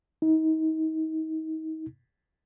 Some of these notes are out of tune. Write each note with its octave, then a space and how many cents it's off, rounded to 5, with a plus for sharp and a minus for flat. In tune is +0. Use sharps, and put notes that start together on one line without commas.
D#4 +35